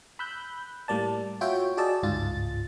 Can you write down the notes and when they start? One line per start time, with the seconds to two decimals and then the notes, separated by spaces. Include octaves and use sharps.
0.19 B5 E6 F#6 G6
0.88 A2 G3 A#3 D5 A5
1.41 F4 F#4 C#5 E5 G5
1.77 F#4 G#4 D5 D#5 A5 E6
2.03 G1 C#2 G#2 F4 A6